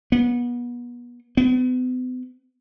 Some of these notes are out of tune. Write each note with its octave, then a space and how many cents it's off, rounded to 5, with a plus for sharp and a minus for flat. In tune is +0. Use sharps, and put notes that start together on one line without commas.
B3 -30
B3 +40